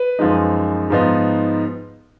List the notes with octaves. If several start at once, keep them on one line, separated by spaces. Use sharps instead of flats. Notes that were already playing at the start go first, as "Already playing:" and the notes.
Already playing: B4
F#2 F3 G#3 D#4
G#2 F3 B3 D#4